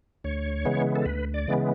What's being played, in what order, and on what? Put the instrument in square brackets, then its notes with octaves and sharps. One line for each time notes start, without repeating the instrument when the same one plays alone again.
[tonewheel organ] D2 C#5
C#3 E3 G#3 B3
A4
D2 B4
D5
C#3 E3 G#3 B3